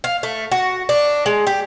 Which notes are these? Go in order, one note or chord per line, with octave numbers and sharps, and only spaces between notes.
F5
A3
F#4
D4
G#3
G4